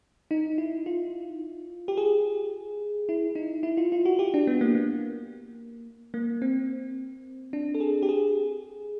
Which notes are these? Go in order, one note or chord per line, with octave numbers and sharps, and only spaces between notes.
D#4
E4
F4
G4
G#4
E4
D#4
E4
F4
F4
F#4
G4
D4
B3
A#3
A#3
A#3
C4
D4
A4
G#4
G4
G#4